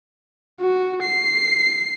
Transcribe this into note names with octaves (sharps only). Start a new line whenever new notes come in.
F#4
C7